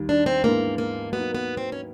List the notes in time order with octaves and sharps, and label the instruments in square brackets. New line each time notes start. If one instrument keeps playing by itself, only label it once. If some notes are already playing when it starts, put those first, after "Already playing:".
Already playing: [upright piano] D#2 D#3 G3
[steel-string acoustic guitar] D4
C4
[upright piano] G#2 E3 G#3 B3 D4 [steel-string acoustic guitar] A#3
[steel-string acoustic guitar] A#3
[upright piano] F#3 A#3 D#4 [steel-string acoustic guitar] B3
[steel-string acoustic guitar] B3
C4
C#4